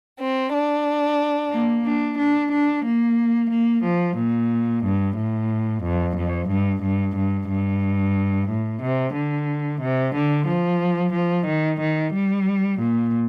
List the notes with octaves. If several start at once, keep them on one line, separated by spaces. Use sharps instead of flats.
C4
D4
A#3
D4
D4
D4
A#3
A#3
F3
A#2
G2
A2
F2
F2
G2
G2
G2
G2
A2
C3
D3
C3
D3
F3
F3
D#3
D#3
G3
A#2